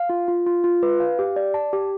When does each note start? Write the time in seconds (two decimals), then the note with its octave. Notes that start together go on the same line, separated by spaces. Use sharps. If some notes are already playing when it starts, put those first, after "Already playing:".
Already playing: F5
0.09 F4
0.28 F4
0.46 F4
0.64 F4
0.83 B4
1.00 F5
1.19 G4
1.36 D5
1.54 A5
1.73 G4